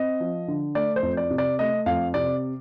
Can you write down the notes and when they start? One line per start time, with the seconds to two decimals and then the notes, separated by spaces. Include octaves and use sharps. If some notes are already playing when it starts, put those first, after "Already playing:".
Already playing: C4 D#5
0.20 F3
0.48 D3
0.75 A3 D5
0.96 C5
1.03 F2
1.17 D5
1.31 C3
1.38 D5
1.59 A3 D#5
1.86 F2 F5
2.14 C3 D5